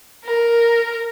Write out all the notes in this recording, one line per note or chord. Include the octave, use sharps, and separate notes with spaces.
A#4